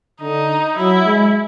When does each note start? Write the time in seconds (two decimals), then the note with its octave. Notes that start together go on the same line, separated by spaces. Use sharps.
0.21 D3 D#4
0.77 F#3 E4
1.05 G#3